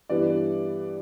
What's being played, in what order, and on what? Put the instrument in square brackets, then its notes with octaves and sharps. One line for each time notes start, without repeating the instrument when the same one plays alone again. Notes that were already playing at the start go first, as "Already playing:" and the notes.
[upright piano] G2 E3 G3 B3 E4 D5